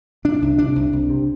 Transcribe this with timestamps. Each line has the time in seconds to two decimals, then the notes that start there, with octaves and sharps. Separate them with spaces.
0.24 C3 D4
0.42 C2
0.58 C3 D4
0.76 C2
0.93 C2
1.10 C3